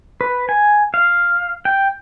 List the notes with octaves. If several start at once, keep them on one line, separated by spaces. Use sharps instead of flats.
B4
G#5
F5
G5